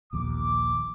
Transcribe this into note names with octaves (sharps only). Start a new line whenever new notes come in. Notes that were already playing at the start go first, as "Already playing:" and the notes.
A#1 D#2 D6